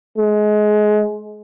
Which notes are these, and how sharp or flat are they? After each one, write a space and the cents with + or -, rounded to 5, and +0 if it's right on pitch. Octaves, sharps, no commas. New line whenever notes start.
G#3 +25